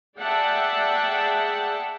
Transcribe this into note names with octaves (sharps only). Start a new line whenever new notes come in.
G#4 D5 E5 F#5 G5 A5